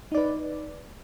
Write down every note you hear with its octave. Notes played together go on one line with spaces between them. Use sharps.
D#4 B4 D5